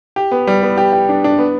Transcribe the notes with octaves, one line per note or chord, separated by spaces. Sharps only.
G4
B3
G3
B3
G4
G4
D4
D4
B3